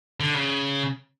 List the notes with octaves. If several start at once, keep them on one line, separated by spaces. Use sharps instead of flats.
D3
C#3